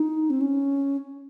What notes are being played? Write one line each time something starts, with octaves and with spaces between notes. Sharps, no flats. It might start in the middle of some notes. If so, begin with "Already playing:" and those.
Already playing: D#4
C4
C#4